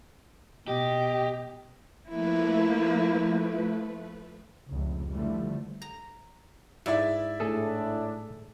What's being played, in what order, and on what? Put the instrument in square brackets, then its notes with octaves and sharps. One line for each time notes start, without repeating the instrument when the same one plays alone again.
[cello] B2 [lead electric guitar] G4 [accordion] D#5
[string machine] F3 A3 B4 [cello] A#3 E4
[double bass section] F1 C#2
D3 E3 F3 G3 A3
[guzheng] A#5
[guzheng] G#2 [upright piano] E4 D5 E5
[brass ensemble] A2 A3 D4 [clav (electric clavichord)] G#4 A4